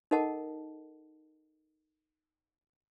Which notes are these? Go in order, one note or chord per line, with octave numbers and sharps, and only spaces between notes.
D#4 A4 A#4 D#5 F#5 A5